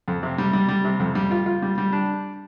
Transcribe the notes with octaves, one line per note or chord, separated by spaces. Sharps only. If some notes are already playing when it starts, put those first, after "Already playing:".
F2
C3
G3
G3
G3
C3
F2
G3
F4
F4
G3
G3
D4